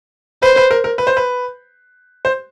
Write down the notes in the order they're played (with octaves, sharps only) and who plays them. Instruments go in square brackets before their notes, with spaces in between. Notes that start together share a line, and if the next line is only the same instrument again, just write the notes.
[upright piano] B4 [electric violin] C5
[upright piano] B4
A#4
A#4
B4
C5
B4
C5